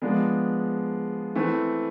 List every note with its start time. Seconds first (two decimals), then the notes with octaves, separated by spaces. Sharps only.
0.02 F3 G#3 B3 D4
1.35 E3 A3 C4